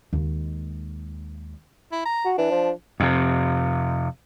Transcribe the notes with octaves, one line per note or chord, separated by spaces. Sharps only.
D#2 G#3
E4
A#5
F#4
E3 D4
F3
F2 C3